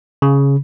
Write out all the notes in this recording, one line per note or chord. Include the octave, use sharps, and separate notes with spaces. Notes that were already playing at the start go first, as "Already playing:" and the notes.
C#3